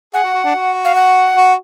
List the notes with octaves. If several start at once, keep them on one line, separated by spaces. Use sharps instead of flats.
G#4 F#5
F#4
F#4
D4
F#4
F5
F#5
F#4